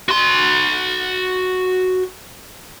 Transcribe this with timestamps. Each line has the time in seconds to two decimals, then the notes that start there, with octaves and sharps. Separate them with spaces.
0.09 F#4 C6